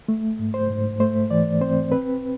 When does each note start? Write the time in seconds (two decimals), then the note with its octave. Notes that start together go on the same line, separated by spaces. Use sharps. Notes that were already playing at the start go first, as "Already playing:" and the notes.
0.08 A3
0.39 G#2
0.54 C5
0.70 G#2
1.00 A3 C5
1.30 E3 D5
1.61 C4 C5
1.92 C4 B4